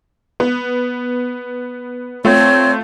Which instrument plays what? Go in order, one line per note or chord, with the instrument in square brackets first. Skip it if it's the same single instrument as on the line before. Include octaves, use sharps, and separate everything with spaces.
[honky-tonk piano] B3
[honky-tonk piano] A3 F4 [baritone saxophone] C4 [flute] C#5